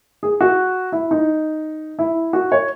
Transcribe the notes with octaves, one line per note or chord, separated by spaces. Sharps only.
G#4
F#4
E4
D#4
E4
F#4
C#5